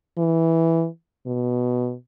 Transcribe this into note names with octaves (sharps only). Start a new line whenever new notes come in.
E3
B2